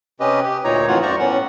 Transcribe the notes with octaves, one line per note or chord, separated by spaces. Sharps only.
C3 C#4 G4 B4 D#5
G4
D2 A#2 D#4 C#5 A#5
F2 A2 E3 F4 F#4 F#5
F#2 C5 D5 A#5 C#6
A2 B3 C#4 F#5